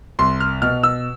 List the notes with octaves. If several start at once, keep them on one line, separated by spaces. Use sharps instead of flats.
C2 C6
F6
B2 F6
E6